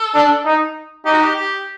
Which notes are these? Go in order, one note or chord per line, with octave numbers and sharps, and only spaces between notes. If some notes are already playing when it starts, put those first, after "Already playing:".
Already playing: A4
D4
D#4
D#4 G4
F#4
G4
G4